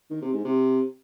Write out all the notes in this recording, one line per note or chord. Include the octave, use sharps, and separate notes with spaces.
D#3
C3
G#2
C3